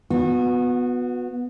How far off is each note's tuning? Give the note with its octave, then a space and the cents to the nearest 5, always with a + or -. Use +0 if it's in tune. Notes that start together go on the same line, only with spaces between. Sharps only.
B3 +0 F#4 -30